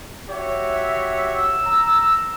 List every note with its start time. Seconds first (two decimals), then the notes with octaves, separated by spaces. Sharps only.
0.29 F#4 G4 C#5 E5
1.35 E6
1.64 A#5